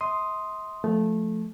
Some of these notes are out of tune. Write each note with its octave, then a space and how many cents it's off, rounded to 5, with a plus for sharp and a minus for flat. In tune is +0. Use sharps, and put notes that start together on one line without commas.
E5 -45 C6 +0 D#6 +0
F3 +0 A3 -10